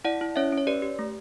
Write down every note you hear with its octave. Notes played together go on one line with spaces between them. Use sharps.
E4 D5 F#5
E4
C#4 C#5 E5
C#4
C#5
G4 B4 D5
G4
A3